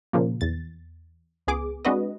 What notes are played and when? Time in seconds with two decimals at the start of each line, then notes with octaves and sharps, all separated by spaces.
0.13 A#2 C#3 F3 A#3
0.41 E2 A6
1.47 C#2 B3 G#4 D6
1.85 G#3 C4 D4 F#4 B4 D#5